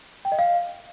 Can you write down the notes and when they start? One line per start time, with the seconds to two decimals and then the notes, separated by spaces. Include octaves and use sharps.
0.25 G5
0.32 D#5
0.39 F5